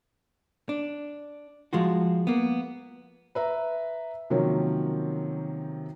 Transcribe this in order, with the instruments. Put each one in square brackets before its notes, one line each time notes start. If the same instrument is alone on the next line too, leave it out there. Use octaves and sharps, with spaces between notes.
[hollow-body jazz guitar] D4
F3 G#3 F4 F#4
A#3 B3
[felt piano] B4 E5 A#5
C3 D#3 F3 F#3 A#3 C#4